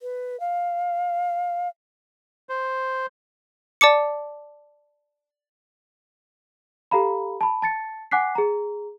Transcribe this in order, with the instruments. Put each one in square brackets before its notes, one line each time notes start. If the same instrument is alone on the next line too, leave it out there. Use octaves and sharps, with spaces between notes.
[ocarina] B4
F5
[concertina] C5
[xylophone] D5 A5 D6 C#7
[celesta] G4 A4 F5 A#5 B5
A5 B5
A5 A6 C#7
F#5 G#5 D6 F#6 B6 C7
G#4 A#5